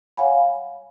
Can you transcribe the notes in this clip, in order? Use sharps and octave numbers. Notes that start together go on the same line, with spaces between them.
C#5 F5 F#5 G#5 B5